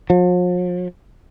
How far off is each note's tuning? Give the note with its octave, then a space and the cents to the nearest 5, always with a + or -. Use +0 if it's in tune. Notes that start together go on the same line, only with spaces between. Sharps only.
F3 +45